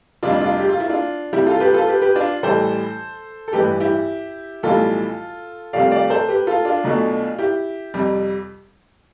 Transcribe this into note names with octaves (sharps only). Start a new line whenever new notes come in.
F1 F2 C3 G3 D4 F4
D4 F4
G4
F4
E4
D4 F4
C2 C3 G3 E4 G4
F4 A4
G4 B4
F4 A4
G4 B4
G4 B4
D4 F4
A1 A2 E3 G3 A4 C5
A4
A1 G2 E3 G4 B4
E4 G4
B1 A2 E3 G3 F4 A4
C2 C3 F3 A3 D5 F5
D5 F5
A4 C5
G4 B4
F4 A4
D4 F4
B1 B2 A3
E4 G4
F2 C3 G3